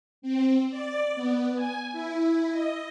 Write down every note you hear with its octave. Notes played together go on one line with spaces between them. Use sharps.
C4
D5
B3
G#5
E4
D#5